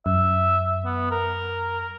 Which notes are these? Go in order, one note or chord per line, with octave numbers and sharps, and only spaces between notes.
F#2 E5
B3
A#4